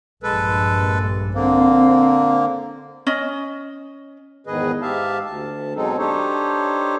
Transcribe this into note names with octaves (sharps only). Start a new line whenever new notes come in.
A#1 G2 G#3 A4 B4
D3 A#3 C4
C#4 D#5
E2 G#2 D#3 G#4 B4 D#5
G#2 G4 E5 F5 A5
D2 A5
B2 F#3 G#3 C4 D#4 A4
D4 D#4 G4 A4 C5 C#5